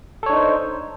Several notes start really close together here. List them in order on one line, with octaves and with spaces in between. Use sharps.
A4 C#5 D4 D#4 C5